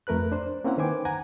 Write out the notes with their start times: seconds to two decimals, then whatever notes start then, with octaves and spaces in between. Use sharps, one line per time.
0.07 F2 A3 A#4 B4 F#6
0.32 D4 C5
0.64 A#3 C4 C#4 E4 F#5
0.78 D#3 B4 C5 G5 G#5 D6
1.05 F#5 G#5 A#5